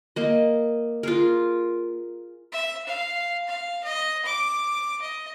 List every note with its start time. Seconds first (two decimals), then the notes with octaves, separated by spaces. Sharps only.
0.16 A#3 D#5
1.03 F4 G#4 A#4
2.52 E5
2.87 F5
3.48 F5
3.84 D#5
4.26 D6
5.02 D#5